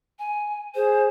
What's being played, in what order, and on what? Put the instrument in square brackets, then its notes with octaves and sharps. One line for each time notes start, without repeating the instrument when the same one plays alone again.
[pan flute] G#5
[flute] G#4 [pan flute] C5